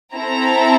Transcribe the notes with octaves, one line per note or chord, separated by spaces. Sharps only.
C4 E4 A4 A#5